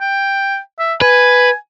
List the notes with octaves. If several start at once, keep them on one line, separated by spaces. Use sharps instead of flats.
G5
E5
B4 G#5